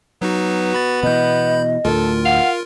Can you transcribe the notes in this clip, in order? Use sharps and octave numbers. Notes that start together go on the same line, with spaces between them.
F#3 B3 D#4 F#4
F#4 B5 A6
B2 E3 D#5 B5 G6
D2 A2 F4 A4 A#4
F5 F#5